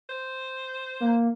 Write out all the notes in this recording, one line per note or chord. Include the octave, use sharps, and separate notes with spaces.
C5
A#3